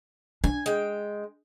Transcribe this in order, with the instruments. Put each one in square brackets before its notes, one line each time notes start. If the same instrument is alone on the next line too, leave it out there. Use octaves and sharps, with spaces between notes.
[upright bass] D4 [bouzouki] G#5
[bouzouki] G#3 G5